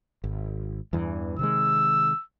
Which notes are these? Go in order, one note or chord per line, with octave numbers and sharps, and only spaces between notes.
G#1
E2 G2 E3
C3 D#3 G#3 E6